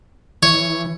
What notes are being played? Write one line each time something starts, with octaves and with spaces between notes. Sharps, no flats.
E3 C#5